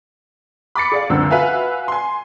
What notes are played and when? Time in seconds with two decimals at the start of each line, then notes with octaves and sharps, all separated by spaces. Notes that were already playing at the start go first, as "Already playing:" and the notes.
0.75 B5 D6 A6 C#7
0.92 G#4 D5 F5
1.10 C#2 F#2 D3 C4 E6
1.31 F#4 B4 E5 F5 G#5
1.88 G#5 C6